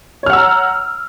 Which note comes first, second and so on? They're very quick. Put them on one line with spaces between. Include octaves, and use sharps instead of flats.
C#5 F6 F#5 E6 A#5